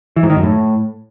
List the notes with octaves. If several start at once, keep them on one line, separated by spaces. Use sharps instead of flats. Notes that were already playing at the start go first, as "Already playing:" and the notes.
E3
G#2
D#3
F#2
A2